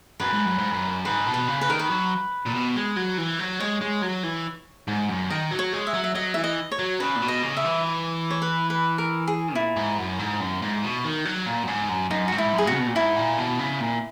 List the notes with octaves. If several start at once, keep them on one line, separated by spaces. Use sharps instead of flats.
F#2 B4
G#2
F#2
G#2
F#2
G#2 B4
B2
B4
C#3
B4
D#3 A#4
B4
F#3
A#2
B2
G#3
F#3
E3
F#3
G#3 C#5
G#3
F#3
E3
G#2
F#2
D#3 D#5
F#3
C#5
G#3
E5
F#3
E5
F#3 D#5
E3 E5
D#5
C#5
F#3
C#3 B4
A#2
B2
D#5
C#3
E5
E3
C#5
B4
B4
A#4
G#4
A#2 E4
G#2
F#2
G#2
F#2
G#2
B2
D#3
F#3
A#2
F#2
G#2
F#2
F#2 D#4
G#2 F#4
E4
F#2
G#4
C#3 F#4
B2
A#2
G#2 E4
A#2
B2
C#3
A#2